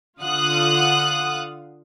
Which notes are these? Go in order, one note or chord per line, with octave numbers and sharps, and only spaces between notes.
D3 F4 F5 F#5 D#6 F#6